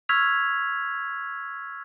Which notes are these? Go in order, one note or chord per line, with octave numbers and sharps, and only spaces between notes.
C#6 E6 F6 G#6 B6 F7